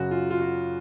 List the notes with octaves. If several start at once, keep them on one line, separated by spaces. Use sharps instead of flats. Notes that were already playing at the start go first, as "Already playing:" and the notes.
Already playing: F#2 C#3 F#3 F#4
F4
F4
F#4